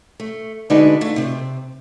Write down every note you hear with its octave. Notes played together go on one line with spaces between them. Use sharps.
A3
D3 G#3 D4 D#4 F#4 B4
A3 F4
C3 C4